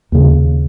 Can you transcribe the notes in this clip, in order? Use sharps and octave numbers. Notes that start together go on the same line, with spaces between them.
D#2 C#3